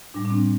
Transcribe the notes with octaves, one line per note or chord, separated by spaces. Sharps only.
A2 G3 D4
D4
C4